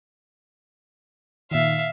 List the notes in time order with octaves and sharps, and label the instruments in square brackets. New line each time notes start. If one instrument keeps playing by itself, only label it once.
[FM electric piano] A#2 D#3 [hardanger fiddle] E5 F5